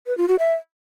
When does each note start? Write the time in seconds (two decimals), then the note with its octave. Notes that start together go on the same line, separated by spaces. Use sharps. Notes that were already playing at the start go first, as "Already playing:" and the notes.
0.07 B4
0.18 F4
0.28 F#4
0.39 E5